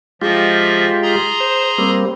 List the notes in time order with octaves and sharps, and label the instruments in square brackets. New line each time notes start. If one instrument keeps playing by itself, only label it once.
[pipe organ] F3 D#5 E5 [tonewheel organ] G#3 F4 G4
[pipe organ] G#4 A#5 C6
[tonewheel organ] C5
G3 A#3 C4